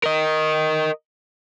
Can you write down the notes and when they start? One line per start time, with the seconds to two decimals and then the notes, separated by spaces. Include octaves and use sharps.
0.03 A#4 D#5